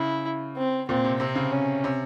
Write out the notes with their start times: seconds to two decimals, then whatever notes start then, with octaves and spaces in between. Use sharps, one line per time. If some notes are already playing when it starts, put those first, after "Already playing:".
Already playing: C#3 E4
0.57 C4
0.89 A#2 C4
1.04 C3
1.20 C3 C4
1.35 C#3
1.52 C#4
1.84 C3